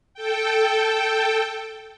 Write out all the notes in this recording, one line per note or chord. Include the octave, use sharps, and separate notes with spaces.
A4 G5